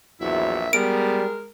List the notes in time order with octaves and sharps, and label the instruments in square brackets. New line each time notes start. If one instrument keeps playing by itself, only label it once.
[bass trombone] A#1 [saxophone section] E2 F#3 E4 [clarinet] E5
[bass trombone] G3 [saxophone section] G#3 A#4 [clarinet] B3 [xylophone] D7